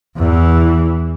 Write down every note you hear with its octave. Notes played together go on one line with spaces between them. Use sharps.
E2 E3